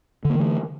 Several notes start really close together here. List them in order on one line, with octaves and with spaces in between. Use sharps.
D3 A#3 E3 A3